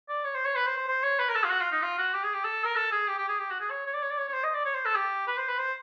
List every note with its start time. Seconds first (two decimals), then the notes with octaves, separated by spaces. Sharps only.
0.09 D5
0.25 C#5
0.35 C5
0.46 C#5
0.56 B4
0.67 C5
0.77 C5
0.88 C5
1.03 C#5
1.19 B4
1.29 A#4
1.35 A4
1.44 F4
1.50 F#4
1.61 F4
1.72 D#4
1.82 F4
1.98 F#4
2.14 G4
2.24 G#4
2.34 G4
2.44 A4
2.65 A#4
2.76 A4
2.92 G#4
3.08 G4
3.18 G4
3.29 G#4
3.39 G4
3.50 F#4
3.60 G#4
3.70 C#5
3.87 C#5
3.94 D5
4.02 C#5
4.10 D5
4.18 C#5
4.28 C#5
4.34 C5
4.44 D#5
4.54 D5
4.65 C#5
4.75 C5
4.86 A4
4.96 G4
5.27 B4
5.38 C5
5.48 B4
5.59 C5